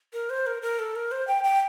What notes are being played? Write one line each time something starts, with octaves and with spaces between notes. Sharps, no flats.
A#4
C5
A#4
A#4
A4
A#4
C5
G5
G5